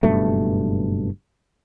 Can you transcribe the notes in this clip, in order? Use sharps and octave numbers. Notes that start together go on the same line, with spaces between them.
F#1 G2 B2 A3